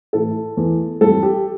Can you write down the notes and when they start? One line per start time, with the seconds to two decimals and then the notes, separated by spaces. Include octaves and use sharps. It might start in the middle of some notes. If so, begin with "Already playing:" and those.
0.13 A2 E3 A3 A4
0.57 E2 E3 A3
1.01 F2 E3 G3 A4
1.23 G4